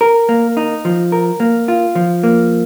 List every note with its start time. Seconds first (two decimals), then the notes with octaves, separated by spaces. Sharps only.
0.01 A#4
0.29 A#3
0.57 D#4
0.85 F3
1.12 A#4
1.40 A#3
1.68 F4
1.95 F3
2.23 A#3